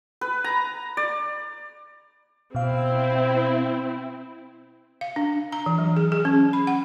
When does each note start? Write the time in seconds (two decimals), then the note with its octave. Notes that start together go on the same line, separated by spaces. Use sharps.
0.21 B4
0.44 A#5
0.97 D5
2.55 B2 C4 E4 F5
5.01 F5
5.16 D4
5.52 A#5
5.66 E3
5.78 F#3
5.97 G#4
6.12 G#4
6.25 C#4
6.53 B5
6.67 F#5